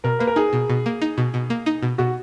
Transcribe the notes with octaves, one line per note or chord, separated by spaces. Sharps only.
B2 A#4
A#3 B4
A#4
D#4 G#4
B2
B2
A#3
D#4
B2
B2
A#3
D#4
B2
B2 F#4